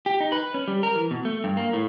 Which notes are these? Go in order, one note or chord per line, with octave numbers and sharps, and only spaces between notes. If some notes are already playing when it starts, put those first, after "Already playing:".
G4
D#4
B4
C#4
G3
A#4
E3
B2
A3
G2
A#3
A2